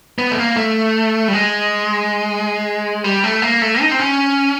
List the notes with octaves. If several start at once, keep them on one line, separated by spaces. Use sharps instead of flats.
B3
A3
A#3
A3
G3
G#3
G3
A3
A#3
A3
D#4
C4
C#4